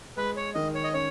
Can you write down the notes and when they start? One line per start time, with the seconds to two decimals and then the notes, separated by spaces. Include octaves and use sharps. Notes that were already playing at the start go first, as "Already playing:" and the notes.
0.17 G#3 B4
0.36 C#5
0.55 D#3 D#5
0.75 C#5
0.84 D#5
0.93 C#4 C#5